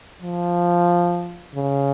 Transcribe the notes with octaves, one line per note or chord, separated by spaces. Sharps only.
F3
C#3